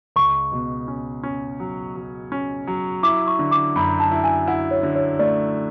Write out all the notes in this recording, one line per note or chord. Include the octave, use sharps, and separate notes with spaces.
C#2 C#6
B2
C#4
C#4
F#3
F#3
C#4
F#3
E4 D6
C#6
D3
D6
F#2 B5
A5
E4
G#5
E4 F#5
C#5
D3
C#5
A3 D5